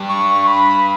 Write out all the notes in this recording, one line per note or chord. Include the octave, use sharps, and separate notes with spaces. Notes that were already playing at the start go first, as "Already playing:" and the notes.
Already playing: G2
C#6
B5